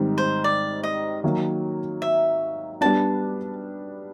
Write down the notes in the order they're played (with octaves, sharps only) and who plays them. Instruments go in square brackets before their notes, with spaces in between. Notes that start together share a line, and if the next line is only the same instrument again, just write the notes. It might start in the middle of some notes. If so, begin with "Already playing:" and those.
Already playing: [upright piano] G#2 D#3 G3 C4
[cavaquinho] C5
D5
D#5
[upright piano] D#3 F#3 A#3
[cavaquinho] E5
[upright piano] G3 B3 D4 [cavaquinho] A5